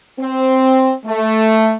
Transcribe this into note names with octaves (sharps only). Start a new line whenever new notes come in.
C4
A3